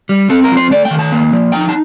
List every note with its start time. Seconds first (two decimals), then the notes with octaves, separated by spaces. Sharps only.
0.09 G3
0.30 C4 A4
0.44 A#4
0.51 F3
0.57 C5
0.71 A3 D5
0.85 G5
0.91 D#3
0.99 A5
1.12 A#3
1.32 F3
1.52 D#4 G5
1.69 A5